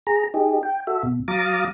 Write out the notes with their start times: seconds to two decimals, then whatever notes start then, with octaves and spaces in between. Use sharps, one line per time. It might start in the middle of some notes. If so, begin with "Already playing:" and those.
0.07 G#4 A#5
0.34 D#4 G4 G#4
0.63 G5
0.87 F#4 A4 E5
1.03 B2
1.28 F#3 F5 A#5 D6 D#6 A6